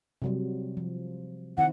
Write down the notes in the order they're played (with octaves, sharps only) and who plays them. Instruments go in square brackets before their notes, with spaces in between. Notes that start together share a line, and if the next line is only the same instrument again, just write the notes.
[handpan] C3 F#3 G3
F3
[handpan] D#3 C4 E4 [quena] F#5